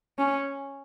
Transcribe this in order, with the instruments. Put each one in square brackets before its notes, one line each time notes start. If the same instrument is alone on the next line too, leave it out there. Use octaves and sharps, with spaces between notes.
[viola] C#4